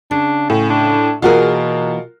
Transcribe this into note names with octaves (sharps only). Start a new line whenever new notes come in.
C#3 D4
A2 C#4
D4
B2 E3 A#3 F4 F#4 G#4 A#4